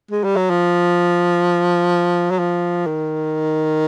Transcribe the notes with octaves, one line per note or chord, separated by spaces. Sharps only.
G#3
G3
F#3
F3
F#3
F3
D#3